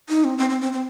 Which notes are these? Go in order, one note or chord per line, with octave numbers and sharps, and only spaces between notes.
D#4
C4
C4
C4
C4
C4